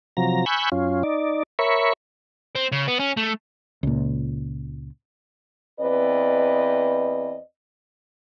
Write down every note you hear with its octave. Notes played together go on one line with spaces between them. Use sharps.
C3 F3 F#3 A#5
G#5 B5 C#6 E6 F#6 G6
F#2 C#4 F4
D#4 D5
A#4 C#5 E5 B5 C#6
C4
C#3
B3
C#4
A3
C#2 A#2
E2 C4 B4 D5 D#5